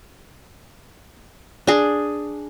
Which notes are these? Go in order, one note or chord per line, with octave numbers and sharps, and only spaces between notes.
D4 G#4